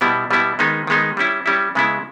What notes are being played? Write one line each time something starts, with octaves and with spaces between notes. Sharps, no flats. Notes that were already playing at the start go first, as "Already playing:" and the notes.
B2 G3 B3 E4
B2 G3 B3 E4
D#3 G#3 B3 D#4
D#3 G#3 B3 D#4
G3 C#4 E4
G3 C#4 E4
C#3 G#3 B3 E4